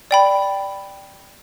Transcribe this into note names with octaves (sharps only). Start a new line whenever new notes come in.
D5 G5 B5